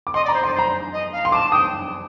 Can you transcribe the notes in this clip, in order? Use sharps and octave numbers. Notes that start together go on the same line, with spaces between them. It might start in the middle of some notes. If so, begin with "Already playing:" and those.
D6
D#5 C6
D5 A#5
C5
D5 C6
C5 A#5
D#5
F5
C6
A5 D6
G5 D#6